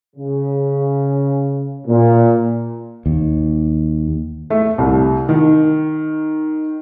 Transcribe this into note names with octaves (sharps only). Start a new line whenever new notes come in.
C#3
A#2
D#2
A3
C2
D#3